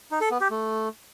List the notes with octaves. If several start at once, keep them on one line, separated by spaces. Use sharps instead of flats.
D#4
A4
B3
G4
A3